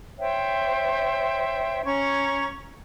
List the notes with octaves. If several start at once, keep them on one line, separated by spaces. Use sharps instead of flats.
C5 C#5 E5 G5
C#4 A#5 C#6 G#6